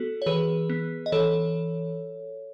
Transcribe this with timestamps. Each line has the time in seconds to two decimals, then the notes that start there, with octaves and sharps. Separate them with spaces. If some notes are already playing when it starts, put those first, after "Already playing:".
Already playing: B3 F#4 A4
0.22 C#5
0.26 E3 G#4 B4
0.70 B3
1.06 D#5
1.12 E3 A4 C#5